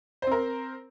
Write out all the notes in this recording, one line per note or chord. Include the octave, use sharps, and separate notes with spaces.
C4 A#4 C5